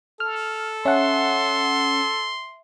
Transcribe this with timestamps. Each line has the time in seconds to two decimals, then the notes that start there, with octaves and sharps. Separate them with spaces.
0.20 A4 F6
0.85 C#4 E5 F#5 A5 C6